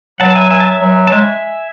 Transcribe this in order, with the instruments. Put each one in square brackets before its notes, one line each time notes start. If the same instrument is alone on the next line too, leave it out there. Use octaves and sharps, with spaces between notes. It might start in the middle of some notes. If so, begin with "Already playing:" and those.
[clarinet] F#3 [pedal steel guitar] F#5 A5
[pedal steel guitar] A5
E5 G#5
E5 G#5
A5
E5 G#5
[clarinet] F#3
[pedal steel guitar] A5
[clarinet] G#3 [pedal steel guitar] E5 G#5